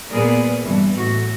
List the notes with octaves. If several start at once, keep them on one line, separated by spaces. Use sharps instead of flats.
A#2 B3 G#4 A#4 B4 D5
G2 B2 E3 G3
A2 F#4